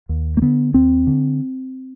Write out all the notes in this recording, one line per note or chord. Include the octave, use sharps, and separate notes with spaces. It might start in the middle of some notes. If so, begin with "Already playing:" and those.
D#2
A#3
D3 B3
D#2 C4
D3